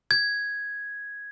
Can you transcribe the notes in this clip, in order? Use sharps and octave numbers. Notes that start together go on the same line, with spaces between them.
G#6